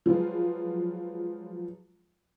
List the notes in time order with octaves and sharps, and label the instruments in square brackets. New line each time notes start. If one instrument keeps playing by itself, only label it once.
[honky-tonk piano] F3 F#3 G#3 F4 G#4 B4